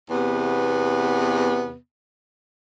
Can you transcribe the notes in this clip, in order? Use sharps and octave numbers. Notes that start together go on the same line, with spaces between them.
E2 C3 B3